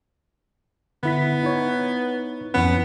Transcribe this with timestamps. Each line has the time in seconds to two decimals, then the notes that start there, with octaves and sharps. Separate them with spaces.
1.03 D3 B3 E4 B6
1.43 D#4 E4 C#5
2.54 F2 E3 B3 C#4